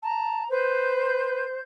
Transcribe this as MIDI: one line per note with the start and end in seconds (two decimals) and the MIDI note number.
0.02 0.43 81
0.02 0.48 82
0.50 1.45 71
0.50 1.59 72
0.50 1.59 91